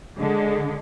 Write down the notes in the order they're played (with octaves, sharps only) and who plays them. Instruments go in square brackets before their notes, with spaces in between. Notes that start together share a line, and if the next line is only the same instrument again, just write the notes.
[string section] D3 G#3